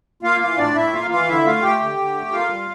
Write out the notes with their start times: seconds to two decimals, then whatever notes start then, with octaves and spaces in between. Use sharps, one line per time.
0.23 A#3 F4 F5
0.40 E3 F4 F5
0.58 A2 D4 D5
0.75 A2 E4 E5
0.93 A#3 F4 F5
1.10 E3 F4 F5
1.27 D3 E4 E5
1.45 A3 F4 F5
1.62 A3 G4 G5
1.80 D3
1.98 D3
2.15 A3
2.32 A#3 F4 F5
2.50 G3